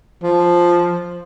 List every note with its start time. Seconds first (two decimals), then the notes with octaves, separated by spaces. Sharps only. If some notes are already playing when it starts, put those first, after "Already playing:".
0.23 F3